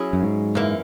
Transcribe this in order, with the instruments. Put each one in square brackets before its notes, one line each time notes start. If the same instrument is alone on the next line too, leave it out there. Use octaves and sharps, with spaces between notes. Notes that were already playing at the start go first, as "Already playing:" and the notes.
Already playing: [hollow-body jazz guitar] F#3 C#4 E4 G#4
[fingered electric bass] F#2
G#2
[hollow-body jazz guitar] F#2 E3 A#3